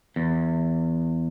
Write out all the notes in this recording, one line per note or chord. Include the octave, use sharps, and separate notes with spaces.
E2